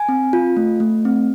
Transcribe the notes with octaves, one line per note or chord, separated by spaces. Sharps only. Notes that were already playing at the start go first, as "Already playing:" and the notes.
Already playing: G#5
C4
F4
A3
A3
C4